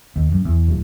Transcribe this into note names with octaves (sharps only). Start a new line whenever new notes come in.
D#2
F#2
E2
D1